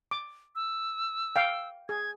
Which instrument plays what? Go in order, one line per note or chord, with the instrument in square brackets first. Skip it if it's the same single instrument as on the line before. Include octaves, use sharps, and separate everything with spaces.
[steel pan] D6
[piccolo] E6
[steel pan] F5 G5
[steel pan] G#4 [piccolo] G#6